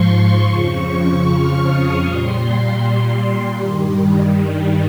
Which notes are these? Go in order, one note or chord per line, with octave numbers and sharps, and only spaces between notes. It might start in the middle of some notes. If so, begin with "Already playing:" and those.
Already playing: G#2 F3 C6 C#6
F2 C#3 F3 C#6
F6
D#6
A#2 G3 C6
G2 D#3 G3